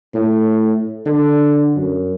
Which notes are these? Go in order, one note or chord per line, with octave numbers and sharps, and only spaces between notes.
A2
D3
F#2